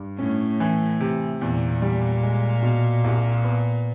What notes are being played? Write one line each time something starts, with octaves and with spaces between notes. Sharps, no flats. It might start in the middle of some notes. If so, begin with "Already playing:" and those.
Already playing: G2
A2 C#4
E3
C3
E2 A#2
G3
G#3
B2
C2
B3